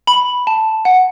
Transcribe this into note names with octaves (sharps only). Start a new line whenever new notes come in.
B5
A5
F#5